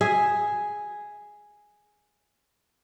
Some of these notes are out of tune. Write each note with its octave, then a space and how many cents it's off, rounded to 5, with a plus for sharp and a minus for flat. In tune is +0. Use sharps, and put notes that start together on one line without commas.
G#4 +0 E5 +0